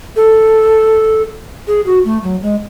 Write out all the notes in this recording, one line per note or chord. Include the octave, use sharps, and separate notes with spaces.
A4
G#4
F#4
A3
F#3
G#3